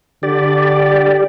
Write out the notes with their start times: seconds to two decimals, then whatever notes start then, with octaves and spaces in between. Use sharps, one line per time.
0.23 D3 G4 D5